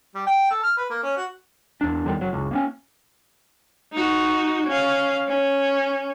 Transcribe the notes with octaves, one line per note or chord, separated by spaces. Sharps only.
G3
G5
A4
F6
B4
A#3
C#4
F#4
E2 D4
E2 D3 D#3 G3
F#1 F#3
F#1 C#2
A#3 B3 C#4
D#4 F#4
C#4 F5
C#4